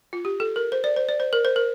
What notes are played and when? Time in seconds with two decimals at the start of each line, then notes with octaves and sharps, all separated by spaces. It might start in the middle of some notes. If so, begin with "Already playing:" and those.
0.13 F4
0.25 G4
0.40 A4
0.56 A#4
0.72 C5
0.84 D5
0.96 C5
1.09 D5
1.20 C5
1.33 A#4
1.45 C5
1.56 A#4